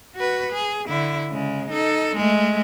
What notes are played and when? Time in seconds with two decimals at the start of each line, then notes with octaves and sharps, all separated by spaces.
0.15 F#4 B4
0.52 G#4
0.89 D3 E4
1.31 C#3 G#3
1.70 D#4 A4
2.16 G#3 A3